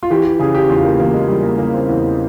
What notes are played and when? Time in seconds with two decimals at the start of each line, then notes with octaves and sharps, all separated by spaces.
0.03 F4
0.10 E3 G4
0.25 G4
0.39 C#3 G#4
0.55 G4
0.69 E2 F4
0.85 A#3
1.00 E2 A#3
1.14 G#3
1.28 E3 G3
1.43 A#3
1.58 C#3 A#3
1.74 C4
1.89 E2